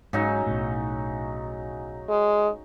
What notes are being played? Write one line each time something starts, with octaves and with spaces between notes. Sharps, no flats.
G#2 C#3 F#3 D#4
B1 A2
G#3